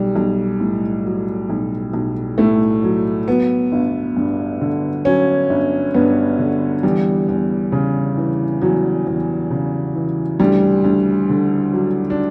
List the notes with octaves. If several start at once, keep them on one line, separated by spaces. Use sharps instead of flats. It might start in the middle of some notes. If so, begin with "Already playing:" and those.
Already playing: B1 G3
B1
A2
F#3
B1
B1
A2 A3
F#3
F#3 B3
G1
G2
D3
F#3 C#4
G1
G2 B3
D3
E2 G3
E2
C#3
E3
E2 F#3
E2
C#3
E3
D2 G3
D2
D3
F#3
D4